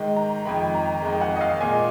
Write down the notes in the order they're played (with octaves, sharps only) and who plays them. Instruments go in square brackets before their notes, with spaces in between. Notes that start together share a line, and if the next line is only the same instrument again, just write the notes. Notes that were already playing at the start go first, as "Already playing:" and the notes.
Already playing: [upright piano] G#2 D#3 G#3
A#5
F2 D#3 G#3 B5
A#5
F2 D#3 G#3
F#5
D#5
F5
A#2 G#3 G#5